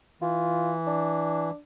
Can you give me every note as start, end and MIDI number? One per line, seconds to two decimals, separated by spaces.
0.21 1.50 52
0.21 0.72 65
0.87 1.57 62